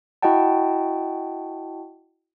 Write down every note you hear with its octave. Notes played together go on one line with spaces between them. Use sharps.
E4 F#4 D#5 F#5 G5 A5